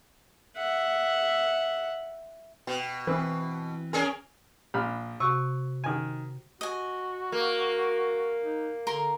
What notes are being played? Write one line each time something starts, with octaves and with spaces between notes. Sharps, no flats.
E5 F#5
B2 G5
E3 C4 B4
C#4 G#4 A#4 G#5
A#1 B5 F6
C3 F#4 C#6
D#3 G#5
F#4 D#5 G#5
A#3
D#4
D3 A#4 A#5 C6